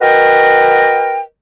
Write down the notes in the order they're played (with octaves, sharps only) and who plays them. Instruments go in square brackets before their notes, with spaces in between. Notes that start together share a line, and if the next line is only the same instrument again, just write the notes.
[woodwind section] F#4 A#4 B4 D#5 G5